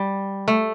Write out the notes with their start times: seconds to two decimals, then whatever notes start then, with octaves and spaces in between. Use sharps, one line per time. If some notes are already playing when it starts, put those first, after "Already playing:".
Already playing: G3
0.48 A3